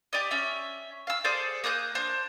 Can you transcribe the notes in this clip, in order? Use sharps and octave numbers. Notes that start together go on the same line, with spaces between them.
G4 D5 D#5
C#4 E5
F5 E6
G#4 A4 C5 D5
A#3 D#6 F#6 G6
D4 C5